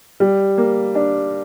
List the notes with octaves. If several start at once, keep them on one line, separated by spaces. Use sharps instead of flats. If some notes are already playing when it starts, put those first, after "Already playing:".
G3
A#3
D4